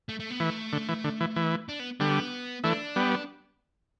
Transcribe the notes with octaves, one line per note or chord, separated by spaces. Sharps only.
A3
A3
B3
E3 A3
D3
E3
D3
E3
E3
D4
B3
D3 G3 B3
E3 A3 D4
G3 B3